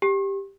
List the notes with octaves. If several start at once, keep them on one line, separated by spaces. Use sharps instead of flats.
G4